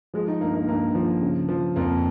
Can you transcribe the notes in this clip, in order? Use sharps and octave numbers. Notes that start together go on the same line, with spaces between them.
F3 G#3
D#4
G2 A#3
A#3
G2 A#3
F3
C#3
F3
F2 A#3